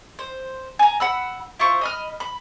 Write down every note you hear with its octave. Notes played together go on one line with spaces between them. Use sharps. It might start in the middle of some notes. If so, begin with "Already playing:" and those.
C5
G#5 A#5
F#5 B5 E6
E4 F4 C5 C#6
D#5 B5 F6
B5